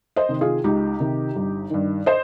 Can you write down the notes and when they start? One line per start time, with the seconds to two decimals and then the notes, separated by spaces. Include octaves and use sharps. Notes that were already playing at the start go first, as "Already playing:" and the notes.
0.16 C5 D#5
0.29 C3 D#3
0.41 F4 G#4
0.64 C#2 D#4 G4
1.00 C3 D#3
1.36 G1
1.70 G2 D#3
2.06 C5 D#5